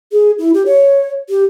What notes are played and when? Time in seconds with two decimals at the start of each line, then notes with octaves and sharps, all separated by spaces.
0.12 G#4
0.39 E4
0.54 G4
0.66 C#5
1.30 G4